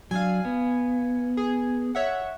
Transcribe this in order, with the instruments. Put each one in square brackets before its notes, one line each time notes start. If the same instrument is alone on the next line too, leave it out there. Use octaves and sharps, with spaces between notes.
[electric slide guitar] F#3 D4 [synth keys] F5 G#5
[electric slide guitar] B3
[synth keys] G#4
C#5 E5 F#5